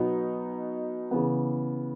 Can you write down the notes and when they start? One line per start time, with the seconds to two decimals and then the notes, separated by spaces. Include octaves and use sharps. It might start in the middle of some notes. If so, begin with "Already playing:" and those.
Already playing: B2 F#3 B3 D#4
1.11 C#3 E3 B3